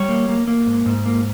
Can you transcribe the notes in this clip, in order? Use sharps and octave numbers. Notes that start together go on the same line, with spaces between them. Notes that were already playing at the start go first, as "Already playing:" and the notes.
Already playing: G3 C#5
A#3
A#3
A#3
G#2
G#2
A#3